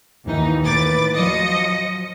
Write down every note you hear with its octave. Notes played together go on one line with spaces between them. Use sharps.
D#2 E3 D#4
D#2 A2 B4 D6 A6
F3 F#3 D#5 D#6 A#6 C#7